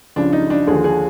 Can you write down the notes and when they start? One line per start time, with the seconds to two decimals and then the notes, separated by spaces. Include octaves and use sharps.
0.16 C#2 C#3 F3 D4
0.33 D#4
0.50 D4
0.67 D#2 D3 F3 G#4
0.84 G#4